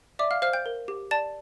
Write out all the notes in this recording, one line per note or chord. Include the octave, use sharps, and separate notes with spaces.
D5 E5 D6
F5 F6
C5 F5 F6
G5 G6
A#4
G4
D5 A5 A6